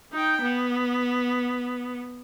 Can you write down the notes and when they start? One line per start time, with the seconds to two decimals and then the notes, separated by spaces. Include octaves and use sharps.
0.12 D#4 G5
0.41 B3